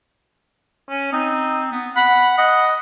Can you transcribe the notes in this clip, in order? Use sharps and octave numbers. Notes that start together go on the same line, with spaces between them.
C#4
C4 D#4
B3
F#5 B5
D#5 F#5